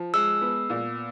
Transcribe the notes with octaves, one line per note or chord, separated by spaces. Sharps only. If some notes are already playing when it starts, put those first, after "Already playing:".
Already playing: F3
G#3 E6
B3
A#2